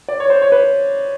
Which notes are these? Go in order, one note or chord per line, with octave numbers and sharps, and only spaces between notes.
D5
C#5
C5
C#5
B4